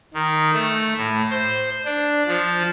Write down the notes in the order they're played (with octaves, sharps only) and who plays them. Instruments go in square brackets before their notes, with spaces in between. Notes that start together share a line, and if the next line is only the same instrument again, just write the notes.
[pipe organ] D#3
A3
A2
C5
D4
F3